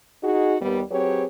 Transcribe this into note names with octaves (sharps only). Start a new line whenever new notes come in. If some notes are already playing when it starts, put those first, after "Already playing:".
D#4 F#4 G#4
D#2 G3 B3
F#3 C4 G4 G#4 B4 C#5